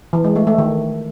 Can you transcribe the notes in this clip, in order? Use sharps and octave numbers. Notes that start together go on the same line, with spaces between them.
E3
G#3
A3
A3
D#3